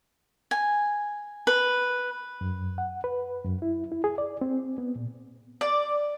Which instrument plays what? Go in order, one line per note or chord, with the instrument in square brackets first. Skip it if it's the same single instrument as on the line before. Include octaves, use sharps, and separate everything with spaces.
[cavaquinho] G#5
B4
[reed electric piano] F#2
F#5
B4
F#2
E4
E4
G#4
D5
C4
B3
A#2
[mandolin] D5